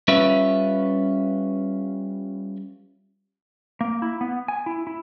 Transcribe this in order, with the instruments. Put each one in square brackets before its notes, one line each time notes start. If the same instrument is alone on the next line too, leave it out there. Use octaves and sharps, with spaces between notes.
[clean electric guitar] G3 C#4 F4 B4 E5
[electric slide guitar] A#3
E4
B3
G#5
E4
E4